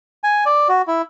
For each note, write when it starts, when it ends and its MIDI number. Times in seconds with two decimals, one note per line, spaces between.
0.24 0.44 80
0.46 0.68 74
0.69 0.82 66
0.88 1.02 64